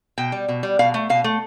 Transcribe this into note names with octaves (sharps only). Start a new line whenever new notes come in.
B2 G5
G3
B2
G3
B2 F5
A3
B2 F5
A3